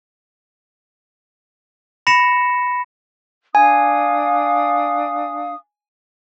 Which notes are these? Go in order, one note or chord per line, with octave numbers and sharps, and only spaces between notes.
B5 A#6 C#7 E7
D4 F5 G#5 D#6